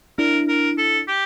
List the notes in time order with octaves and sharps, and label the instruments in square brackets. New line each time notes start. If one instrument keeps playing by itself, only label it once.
[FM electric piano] D4 E4 [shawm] A#4
[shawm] A#4
A4
G4